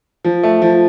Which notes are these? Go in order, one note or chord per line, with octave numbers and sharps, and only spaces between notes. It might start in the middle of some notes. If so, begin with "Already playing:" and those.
F3
A3
F3